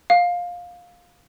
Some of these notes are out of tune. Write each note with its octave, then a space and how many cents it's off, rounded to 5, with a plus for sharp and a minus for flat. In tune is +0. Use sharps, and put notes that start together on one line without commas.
F5 +15